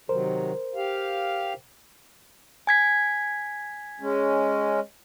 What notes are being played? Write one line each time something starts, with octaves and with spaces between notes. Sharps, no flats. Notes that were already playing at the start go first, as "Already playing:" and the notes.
C3 D#3 F#3 A#4 C5
G4 F5
G#5 G#6 B6
G#3 C#4